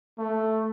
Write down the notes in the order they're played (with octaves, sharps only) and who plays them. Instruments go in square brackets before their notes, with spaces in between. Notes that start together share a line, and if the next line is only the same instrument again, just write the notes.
[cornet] A3